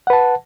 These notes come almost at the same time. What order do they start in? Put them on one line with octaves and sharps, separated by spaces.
F#5 B4 A5